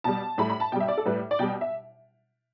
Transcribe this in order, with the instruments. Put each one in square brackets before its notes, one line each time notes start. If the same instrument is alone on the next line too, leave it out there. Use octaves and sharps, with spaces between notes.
[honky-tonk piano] B2 G3 A5
A2 G3 B5
B5
A5
B2 G3 G5
E5
D5
A4
A2 G3 B4
D5
B2 G3 G5
E5